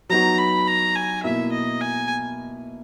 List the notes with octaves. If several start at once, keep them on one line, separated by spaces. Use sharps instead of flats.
F#3 B3 D#4 F#4 A#5
B5
A#5
G#5
B2 A#3 E4 E5
D#5
G#5